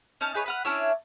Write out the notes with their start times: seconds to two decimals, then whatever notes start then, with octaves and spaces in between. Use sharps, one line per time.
0.21 C#4 D#4 A5 F6
0.34 D#4 G#4 B4 C#5
0.46 B4 F#5 F6
0.65 C#4 D4 E4 C#5